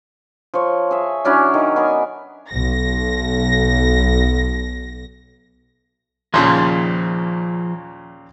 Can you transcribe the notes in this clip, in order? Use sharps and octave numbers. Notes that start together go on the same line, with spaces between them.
F3 C#5
G#4 E5
F#3 C#4 D4 E4
D#3
B3 D4 A#4 G#5
B1 A#6
D#2 A#2 C#3 F3 G#4 C6